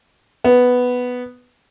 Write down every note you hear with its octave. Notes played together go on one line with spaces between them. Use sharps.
B3